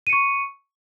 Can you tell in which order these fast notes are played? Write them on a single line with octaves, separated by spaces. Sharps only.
D#7 C#7 C#6